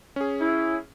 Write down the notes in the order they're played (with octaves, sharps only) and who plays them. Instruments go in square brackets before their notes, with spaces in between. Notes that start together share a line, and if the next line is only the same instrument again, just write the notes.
[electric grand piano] C#4 G#4
[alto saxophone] E4